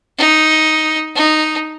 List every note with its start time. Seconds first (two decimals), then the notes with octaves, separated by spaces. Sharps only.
0.18 D#4
1.16 D#4